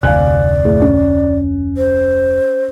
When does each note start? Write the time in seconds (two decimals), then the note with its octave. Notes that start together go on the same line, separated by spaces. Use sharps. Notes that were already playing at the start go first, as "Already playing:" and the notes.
0.03 F1 D2 C3 D5 F5 G#5 F#6
0.65 A2 G#4
0.82 C#4
1.77 C5